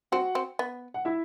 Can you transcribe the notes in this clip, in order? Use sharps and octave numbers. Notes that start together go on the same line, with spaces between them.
C4 F#4 F#5
C4
B3
F#5
E4 E5